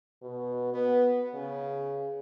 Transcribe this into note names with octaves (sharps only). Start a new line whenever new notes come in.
B2
B3
C#3